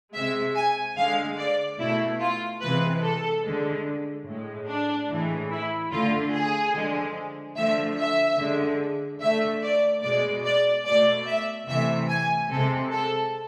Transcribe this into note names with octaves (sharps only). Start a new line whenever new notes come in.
C3 G#3 E5
G#5
D3 G#3 F5
D5
B2 A3 E4
F4
C3 E3 G#3 B4
A4
D3 G#3
A2 G#3
D4
A2 E3 G#3
E4
D3 A3 F4
G#4
D3 F3 G#3
D3 F3 A3 E5
E5
D3 G#3
D3 A3 E5
D5
B2 G#3 D5
D5
B2 A3 D5
E5
C3 E3 A3 E5
G#5
C3 G#3 A4
A4